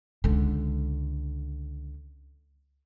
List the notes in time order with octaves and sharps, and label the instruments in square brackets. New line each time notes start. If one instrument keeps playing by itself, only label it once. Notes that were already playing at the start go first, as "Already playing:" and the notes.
[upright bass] C#2 D3